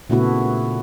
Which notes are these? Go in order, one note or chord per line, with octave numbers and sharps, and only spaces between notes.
A#2 C#3 A3 B3 E4 F#4